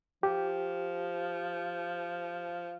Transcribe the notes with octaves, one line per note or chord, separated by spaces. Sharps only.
F3 G4